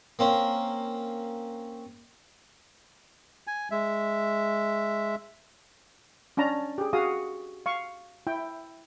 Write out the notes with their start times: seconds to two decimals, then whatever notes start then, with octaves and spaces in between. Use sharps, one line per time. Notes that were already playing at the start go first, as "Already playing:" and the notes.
0.19 A#3 C4 C#4
3.47 G#5
3.71 G#3 E5
6.37 C#4 D4 A5 A#5
6.78 G4 G#4
6.93 F#4 G#4 F5 D#6
7.66 F5 C#6
8.27 E4 G5